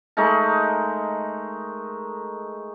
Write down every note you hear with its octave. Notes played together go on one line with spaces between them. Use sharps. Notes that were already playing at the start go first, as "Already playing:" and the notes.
G#3 A3 D#4 A#4